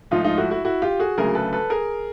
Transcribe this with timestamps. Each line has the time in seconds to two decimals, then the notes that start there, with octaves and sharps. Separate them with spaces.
0.11 G#2 F3 A3 D#4 F4
0.24 D#4 F4
0.38 E4 F#4
0.51 E4 F#4
0.65 E4 F#4
0.82 F4 G4
1.00 F#4 G#4
1.17 D2 C#3 F#3 A3 G#4 A#4
1.35 A4 B4
1.53 A4 B4
1.70 G#4 A#4